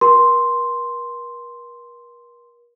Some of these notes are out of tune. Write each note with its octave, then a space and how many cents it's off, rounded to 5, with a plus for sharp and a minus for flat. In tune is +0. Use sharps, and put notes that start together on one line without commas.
A#4 +40 C6 +0